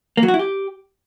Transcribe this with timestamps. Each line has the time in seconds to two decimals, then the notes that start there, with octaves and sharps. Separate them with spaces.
0.17 A#3
0.23 F#3
0.28 F#4
0.34 E4
0.39 G4